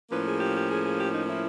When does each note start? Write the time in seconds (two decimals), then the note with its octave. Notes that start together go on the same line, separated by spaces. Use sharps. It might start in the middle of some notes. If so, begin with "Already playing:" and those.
0.11 A2 F3 A#3 C#4 B4
0.26 G#4
0.40 G4
0.55 G4
0.70 G#4
0.84 G#4
0.99 G4
1.13 D#4
1.28 E4